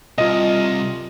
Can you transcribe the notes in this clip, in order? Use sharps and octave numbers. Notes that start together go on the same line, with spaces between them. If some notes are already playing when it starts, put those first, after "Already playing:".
C2 F4 D#5